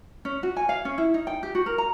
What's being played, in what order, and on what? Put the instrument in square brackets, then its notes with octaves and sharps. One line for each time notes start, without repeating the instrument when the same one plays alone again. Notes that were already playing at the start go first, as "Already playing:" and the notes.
[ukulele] C#4
F#4
G#5
F5
C#4
E4
D#4
G5
G4
F#4
A#4
A#5